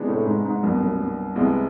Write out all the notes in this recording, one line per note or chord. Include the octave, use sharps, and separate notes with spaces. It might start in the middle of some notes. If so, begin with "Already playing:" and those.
Already playing: C3 E3 G#3 B3 D4
A2
G#2
G#2
C2 G2 B2 F#3 A#3
F#2
G2
C2 C3 E3 G#3 B3